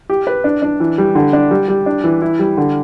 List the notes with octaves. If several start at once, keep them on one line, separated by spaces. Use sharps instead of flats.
G4
B4
D4
D4
E3
G3
D3
D4
G3
G3
D4
E3
E4
G3
D3